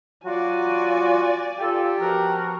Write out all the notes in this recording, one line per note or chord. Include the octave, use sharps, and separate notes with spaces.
F#3 F4 F#4 D5 G#5
F4 G4 A4
B2 F3 F#4 A#4